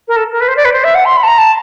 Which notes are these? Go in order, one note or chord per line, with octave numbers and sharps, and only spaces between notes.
A#4
A4
A#4
B4
C5
D5
B4
C5
E5
F#5
C6
B5
A5
A#5
A5